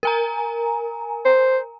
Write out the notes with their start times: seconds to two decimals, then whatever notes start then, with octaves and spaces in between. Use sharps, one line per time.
0.03 A#4 G#5 A#5
1.25 C5